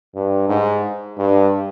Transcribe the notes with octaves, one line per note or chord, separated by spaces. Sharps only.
G2
G#2
G2